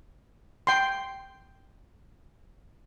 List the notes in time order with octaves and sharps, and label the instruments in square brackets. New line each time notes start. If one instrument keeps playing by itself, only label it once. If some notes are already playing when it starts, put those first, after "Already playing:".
[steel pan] G5 C6